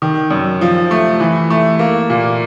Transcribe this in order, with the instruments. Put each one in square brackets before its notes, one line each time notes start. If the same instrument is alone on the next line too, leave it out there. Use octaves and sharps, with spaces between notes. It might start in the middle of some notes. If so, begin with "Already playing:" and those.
[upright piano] D#3
F#2
F3
A3
E3
A3
A#3
A#2